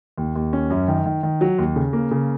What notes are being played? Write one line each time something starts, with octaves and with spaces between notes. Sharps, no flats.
D#2
D#2
C#4
F#2
D#3
D#3
D#3
F#3
D#2
C#3
A#3
C#3